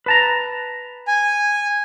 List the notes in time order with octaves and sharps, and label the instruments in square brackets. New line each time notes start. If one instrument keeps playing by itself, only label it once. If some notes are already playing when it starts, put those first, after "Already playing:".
[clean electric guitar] B4 A5 A#5
[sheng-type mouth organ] G#5